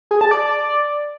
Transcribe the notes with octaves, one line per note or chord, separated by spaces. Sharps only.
G#4
A5
D5